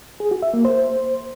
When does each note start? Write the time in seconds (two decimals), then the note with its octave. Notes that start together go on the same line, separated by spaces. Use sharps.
0.20 G#4
0.31 F#4
0.42 E5
0.54 A#3
0.65 C5